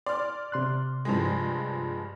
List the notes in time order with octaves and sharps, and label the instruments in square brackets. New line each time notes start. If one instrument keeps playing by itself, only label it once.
[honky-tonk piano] D5 F6 [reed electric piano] C6
[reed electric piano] C3 C6 F#6
[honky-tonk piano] G2 F3 G#3